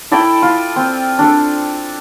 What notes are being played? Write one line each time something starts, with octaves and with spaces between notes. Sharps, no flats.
E4 A4 D5 G5
F4
C4
D4 A4